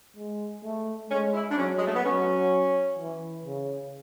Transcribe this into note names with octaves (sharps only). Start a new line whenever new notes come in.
G#3
A3
G#3 C#4
E4
D4
F#3 C#4
G#3
A3
B3
F#3 C#4
E3
C#3